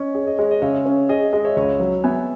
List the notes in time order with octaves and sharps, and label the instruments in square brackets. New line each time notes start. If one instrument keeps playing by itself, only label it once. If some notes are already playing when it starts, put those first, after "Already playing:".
Already playing: [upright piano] C#4 [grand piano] D#5
[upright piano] G#4 [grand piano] C#5
[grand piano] D#5
[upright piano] G#3 [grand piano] C#5
[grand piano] D#5
[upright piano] C#3 [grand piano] C#5 E5
[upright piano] C#4
[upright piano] G#4 [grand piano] D#5
[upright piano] G#3 [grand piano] D#5
[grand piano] C#5 E5
[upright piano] C#2 [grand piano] C#5 E5
[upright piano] F#3
[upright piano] B3 [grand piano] E5 G#5